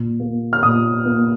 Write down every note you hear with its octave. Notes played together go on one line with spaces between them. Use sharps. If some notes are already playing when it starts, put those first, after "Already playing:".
Already playing: A#2
A#3
F6
A#2 D#6
A#3